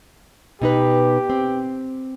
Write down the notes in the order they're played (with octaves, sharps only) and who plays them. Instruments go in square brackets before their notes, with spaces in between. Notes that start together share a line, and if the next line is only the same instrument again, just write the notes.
[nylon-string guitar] B2 D#4 B4 [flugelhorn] G4
[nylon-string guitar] C4